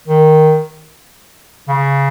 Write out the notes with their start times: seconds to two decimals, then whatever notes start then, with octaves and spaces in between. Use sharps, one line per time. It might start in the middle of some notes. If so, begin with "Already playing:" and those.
0.08 D#3
1.68 C#3